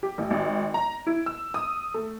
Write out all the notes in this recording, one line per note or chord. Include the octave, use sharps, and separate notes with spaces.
G4
A1
G#1
A#5
E4
E6
D#6
A3